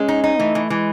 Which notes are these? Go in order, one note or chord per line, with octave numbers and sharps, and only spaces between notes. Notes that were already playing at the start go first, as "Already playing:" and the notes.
Already playing: G#3 C#4
D#4
D#4
E3 A3
E3
E3 G#3